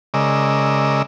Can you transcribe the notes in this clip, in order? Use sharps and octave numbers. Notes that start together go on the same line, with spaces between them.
C#3 G#3 A#4 D5 D#5 E6